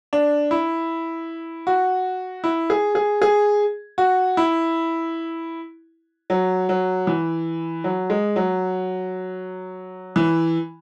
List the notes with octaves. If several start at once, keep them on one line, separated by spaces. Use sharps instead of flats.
D4
E4
F#4
E4
G#4
G#4
G#4
F#4
E4
F#3
F#3
E3
F#3
G#3
F#3
E3